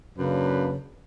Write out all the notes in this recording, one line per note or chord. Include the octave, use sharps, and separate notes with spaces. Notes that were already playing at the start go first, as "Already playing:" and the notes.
F#2 C#3 A#3 D4 B4